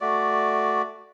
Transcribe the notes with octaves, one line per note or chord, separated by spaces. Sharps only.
A3 F#4 D5